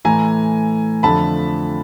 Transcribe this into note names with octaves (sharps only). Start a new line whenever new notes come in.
A2 E3 A3 G#5 A#5
F2 D3 F3 A3 A5 B5